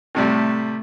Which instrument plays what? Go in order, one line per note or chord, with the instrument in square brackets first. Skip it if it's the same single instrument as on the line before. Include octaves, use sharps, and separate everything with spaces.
[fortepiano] A2 C3 G3 [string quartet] A3